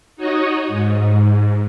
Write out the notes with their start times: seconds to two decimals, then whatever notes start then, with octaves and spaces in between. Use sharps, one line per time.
0.16 D#4 F#4 C#5 D#5
0.68 G#2